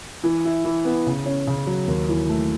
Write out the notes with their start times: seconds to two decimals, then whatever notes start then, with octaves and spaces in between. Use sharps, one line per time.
0.24 E3
0.45 E4
0.65 E3
0.85 B3
1.07 C#3
1.26 C#4
1.47 C#3
1.67 F#3
1.88 D#2
2.09 E3
2.29 A3